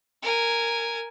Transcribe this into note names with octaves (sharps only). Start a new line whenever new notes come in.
A#4 G#5